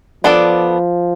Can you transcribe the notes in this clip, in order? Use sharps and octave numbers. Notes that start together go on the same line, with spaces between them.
F3 B3 D4 A4 D5